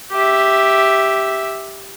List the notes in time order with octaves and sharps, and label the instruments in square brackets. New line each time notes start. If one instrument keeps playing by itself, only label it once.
[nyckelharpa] G4 E5